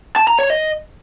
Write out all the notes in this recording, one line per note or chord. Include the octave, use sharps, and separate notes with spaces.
A5
A#5
C#5
D#5